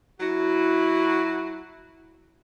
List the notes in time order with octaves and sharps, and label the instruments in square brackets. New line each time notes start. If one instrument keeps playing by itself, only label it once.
[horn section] F#3 E4 F#4